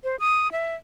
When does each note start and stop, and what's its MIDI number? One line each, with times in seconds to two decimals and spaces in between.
0.04 0.16 72
0.20 0.51 87
0.52 0.75 76